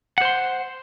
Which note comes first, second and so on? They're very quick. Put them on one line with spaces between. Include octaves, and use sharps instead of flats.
F#5 C5 C6